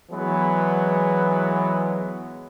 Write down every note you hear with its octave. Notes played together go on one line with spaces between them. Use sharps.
E3 F#3 G#3 B3